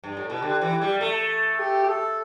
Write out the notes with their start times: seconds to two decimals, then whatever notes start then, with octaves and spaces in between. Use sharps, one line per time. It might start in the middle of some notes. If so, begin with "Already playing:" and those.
0.04 G2
0.17 A2
0.30 B2
0.42 D3 G4
0.61 E3
0.81 G3
1.00 A3 A4
1.59 G4
1.84 G4
1.89 A4